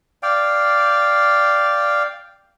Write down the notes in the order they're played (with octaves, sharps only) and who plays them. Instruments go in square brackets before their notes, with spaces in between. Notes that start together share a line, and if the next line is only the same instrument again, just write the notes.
[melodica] D5 F5 G5